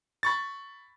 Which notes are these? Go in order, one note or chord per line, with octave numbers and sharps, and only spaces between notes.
B5 C#6 A6